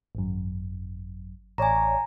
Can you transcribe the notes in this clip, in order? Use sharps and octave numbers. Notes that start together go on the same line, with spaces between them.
G#1 F#2
A1 C#5 D5 G#5 A#5